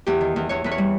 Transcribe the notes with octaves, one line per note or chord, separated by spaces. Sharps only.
E2 G4
D#3
E2
E2 C#5
E2 B4
C#5
G3